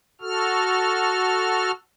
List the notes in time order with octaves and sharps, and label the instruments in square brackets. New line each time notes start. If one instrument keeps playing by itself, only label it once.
[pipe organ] F#4 A4 F6